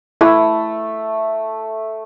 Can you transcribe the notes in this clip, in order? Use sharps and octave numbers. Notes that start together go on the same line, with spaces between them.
A3 E4